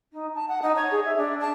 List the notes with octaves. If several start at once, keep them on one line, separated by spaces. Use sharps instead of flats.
D#4
A5
F#5
D#4
C#5
G#4
E5
D4
A5